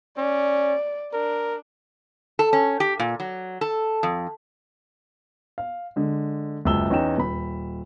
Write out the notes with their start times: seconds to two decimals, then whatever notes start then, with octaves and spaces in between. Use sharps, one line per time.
0.18 C#4 D5
1.13 D4 A#4
2.39 A4
2.53 C#4
2.80 G4
2.99 A#2
3.20 F#3
3.61 A4
4.03 F2
5.58 F5
5.96 D3 G#3
6.65 F#1 C#2 E5 A5 E6 G7
6.90 E2 C#4 D#4 G5 E7
7.18 D#1 B5